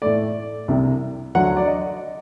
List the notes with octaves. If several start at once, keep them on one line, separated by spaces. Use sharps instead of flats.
A2 A3 D5
C2 C3 G3
D2 D3 F#3 A3 F#5
D5
D#5